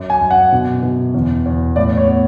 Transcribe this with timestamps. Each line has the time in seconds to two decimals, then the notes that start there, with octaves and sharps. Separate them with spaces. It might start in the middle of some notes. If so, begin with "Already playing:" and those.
Already playing: F#2
0.10 G#5
0.21 F#2
0.31 F#5
0.52 B2
0.82 B2
1.14 E2
1.46 E2
1.76 A2 D5
1.97 C#5
2.08 B3